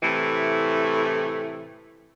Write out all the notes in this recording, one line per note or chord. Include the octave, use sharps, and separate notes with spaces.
A2 C3 E3 A3